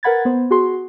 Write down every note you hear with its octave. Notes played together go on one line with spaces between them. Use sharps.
A#4 B4 F#5 B5 G#6 A6
B3 C5
F#4 G#4 C6